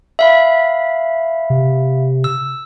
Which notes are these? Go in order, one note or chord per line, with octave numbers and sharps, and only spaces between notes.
E5 F5 B5
C3
E6